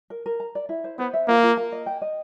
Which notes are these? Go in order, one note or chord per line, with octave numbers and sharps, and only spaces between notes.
A#4
A#4
A#5
D5
E4
C5
B3 C5
E5
A#3 F4
F4
A#4
D#5
G5
D#5